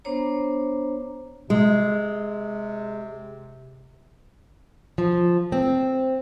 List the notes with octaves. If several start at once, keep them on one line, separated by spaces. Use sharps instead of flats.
B3 D4 C5 C#5 A#5
C3 G#3
F3
C4